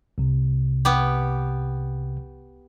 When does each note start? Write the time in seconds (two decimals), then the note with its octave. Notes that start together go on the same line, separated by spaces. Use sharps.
0.18 C2 C3
0.85 B3 G4